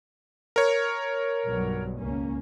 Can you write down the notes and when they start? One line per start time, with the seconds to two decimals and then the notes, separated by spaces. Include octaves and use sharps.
0.56 A#4 C#5
1.45 B1 G2 F#3
1.98 C#2 A#3 C#4